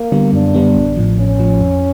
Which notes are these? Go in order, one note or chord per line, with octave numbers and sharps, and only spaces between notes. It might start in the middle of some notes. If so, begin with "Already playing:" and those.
Already playing: A#3
D3 G3 B3
F#2 D4
D3 G3 B3
A1
A2 F3
A1 C#4
A2 F3
F2